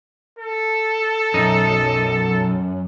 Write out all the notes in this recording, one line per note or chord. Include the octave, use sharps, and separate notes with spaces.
A4
B1 F#2 D#4